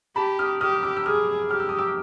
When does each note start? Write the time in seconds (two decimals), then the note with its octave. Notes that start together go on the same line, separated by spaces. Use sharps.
0.16 G4 A5 B5
0.39 D#6 F6
0.61 G4 D#6 F6
0.73 F6
0.83 D6 E6
0.97 E6
1.06 G#4 D#6 F6
1.50 G4 F6
1.60 E6
1.69 D#6
1.78 D6 E6